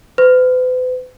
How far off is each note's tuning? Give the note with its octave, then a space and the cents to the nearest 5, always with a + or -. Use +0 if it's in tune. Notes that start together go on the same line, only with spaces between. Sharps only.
B4 +45